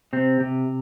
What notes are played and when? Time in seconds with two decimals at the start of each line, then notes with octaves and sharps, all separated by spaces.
0.13 C3 C4
0.40 C3